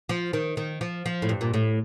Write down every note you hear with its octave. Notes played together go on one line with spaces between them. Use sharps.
F3
D#3
D#3
F3
F3
A2
G2
A#2
A2